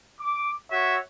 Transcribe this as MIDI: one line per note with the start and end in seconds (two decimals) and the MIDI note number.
0.19 0.51 86
0.71 0.97 66
0.71 0.97 73
0.71 0.97 76